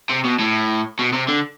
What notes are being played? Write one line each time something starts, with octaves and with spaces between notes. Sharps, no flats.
C3
B2
A2
B2
C3
D3